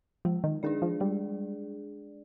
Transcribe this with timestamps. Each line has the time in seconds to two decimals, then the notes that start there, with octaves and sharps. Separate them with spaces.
0.25 F3 G#3
0.44 D#3
0.63 D#3 D4 G#4 D5
0.82 F3
1.00 G3 G#3